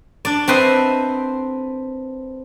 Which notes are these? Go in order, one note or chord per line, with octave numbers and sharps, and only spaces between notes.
D4 D5
C4 A4 B4 C5 D#5 E5